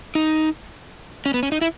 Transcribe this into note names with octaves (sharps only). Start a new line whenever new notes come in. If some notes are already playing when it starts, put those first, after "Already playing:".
D#4
C#4
B3
C#4
D#4
E4